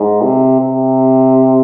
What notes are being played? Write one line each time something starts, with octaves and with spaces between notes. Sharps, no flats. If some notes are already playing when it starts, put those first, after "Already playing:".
Already playing: G#2
C3
C3